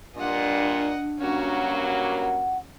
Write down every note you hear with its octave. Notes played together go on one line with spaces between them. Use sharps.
G2 A#2 D4 D#5 F#5
G2 F#3 A#3 C#4 F#4
F#5